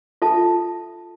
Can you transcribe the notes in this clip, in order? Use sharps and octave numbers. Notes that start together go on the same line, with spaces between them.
F4 A4 E5 A5